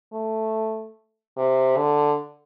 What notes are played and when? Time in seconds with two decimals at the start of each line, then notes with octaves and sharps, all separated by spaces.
0.13 A3
1.37 C3
1.77 D3